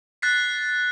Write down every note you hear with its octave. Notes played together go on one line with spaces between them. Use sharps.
F#6 A6 B6 C7